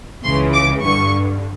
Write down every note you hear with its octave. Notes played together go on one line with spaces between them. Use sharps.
C#2 C#3 E3 C6
D6
G2 D3 C#6